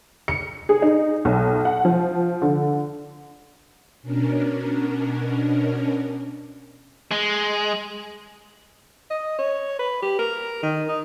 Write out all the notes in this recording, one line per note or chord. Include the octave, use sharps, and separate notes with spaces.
C#7
G#4
D#4
B1
F#5
F3
D3
B2 C#4 D4 A#4
G#3
D#5
C#5
B4
G4
A#4
D#3
D#4